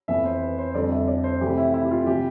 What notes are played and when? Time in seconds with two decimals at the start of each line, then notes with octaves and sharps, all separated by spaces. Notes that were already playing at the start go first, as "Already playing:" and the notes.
0.08 F2 E3 B3 E5
0.25 C5
0.41 B4
0.58 C5
0.74 F2 D3 G3 D5
0.92 E5
1.08 D5
1.24 C5
1.41 C3 E3 A3 C4 G4
1.57 E4
1.74 E4
1.85 G4
1.91 F4
2.07 C3 E3 G4